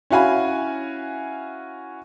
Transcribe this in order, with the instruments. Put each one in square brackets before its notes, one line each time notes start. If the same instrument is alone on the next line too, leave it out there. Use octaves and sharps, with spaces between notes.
[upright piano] C#4 E4 F#4 F5 G#5 B5